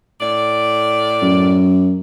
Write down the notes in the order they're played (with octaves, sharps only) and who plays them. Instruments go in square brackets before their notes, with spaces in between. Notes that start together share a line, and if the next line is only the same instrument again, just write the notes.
[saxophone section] A2 D5
[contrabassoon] F#2